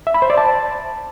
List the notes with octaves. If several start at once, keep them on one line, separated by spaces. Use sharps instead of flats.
E5
B5
C5
D5
A5